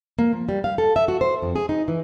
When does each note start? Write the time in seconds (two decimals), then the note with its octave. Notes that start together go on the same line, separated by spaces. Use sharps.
0.19 A#3
0.33 F3
0.49 G3
0.64 F5
0.78 A4
0.96 E5
1.08 F#4
1.21 C5
1.42 F2
1.56 G#4
1.69 D#4
1.88 E3